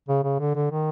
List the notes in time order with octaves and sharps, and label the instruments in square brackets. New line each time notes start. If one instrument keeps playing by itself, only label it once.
[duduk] C#3
C#3
D3
D3
D#3